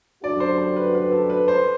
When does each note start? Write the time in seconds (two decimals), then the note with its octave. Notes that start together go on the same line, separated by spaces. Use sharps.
0.23 F#2 D3 G3 D4 F#4 D5
0.40 C5
0.58 C5
0.76 B4
0.95 B4
1.12 A4
1.30 B4
1.48 C5